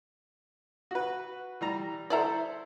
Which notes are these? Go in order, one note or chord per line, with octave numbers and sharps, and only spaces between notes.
F#4 B4
E3 G3 A#5
E4 A4 C5 D5 E5 A#5